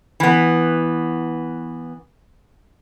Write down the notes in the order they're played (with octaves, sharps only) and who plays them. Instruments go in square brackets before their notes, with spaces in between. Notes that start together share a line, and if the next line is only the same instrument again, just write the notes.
[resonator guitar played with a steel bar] E3 B3